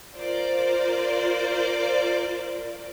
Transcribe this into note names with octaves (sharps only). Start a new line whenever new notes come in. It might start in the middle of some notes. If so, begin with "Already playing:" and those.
F4 A#4 C5 D5